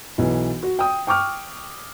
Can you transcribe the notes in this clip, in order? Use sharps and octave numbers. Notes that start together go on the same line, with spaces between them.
B1 E3
F#4
G5 D#6
G5 C#6 D6 F6